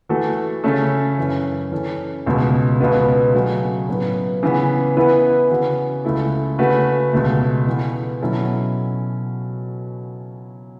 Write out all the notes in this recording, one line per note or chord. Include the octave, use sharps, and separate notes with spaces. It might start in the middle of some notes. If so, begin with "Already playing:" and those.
E3 A3 F#4 A4
C#3 A3 C#4 A4
F#2 E3 C#4
E3 C#4 A4
C#2 B2 A3
C#2 B2 B3
C#3 F#3 A3 F#4
A2 F#3 B3
C#3 E3 B3
E3 B3 E4 B4
C#3 E3 B3 F#4 B4
C#2 C#3 A3 E4 A4
C#3 A3 F#4 B4
C#2 B2 A3
E3 B3 A4
B2 F#3 C#4 E4 A4